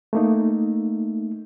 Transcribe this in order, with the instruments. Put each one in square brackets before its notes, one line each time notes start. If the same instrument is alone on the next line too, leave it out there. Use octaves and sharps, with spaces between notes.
[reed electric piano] A3 A#3 D#4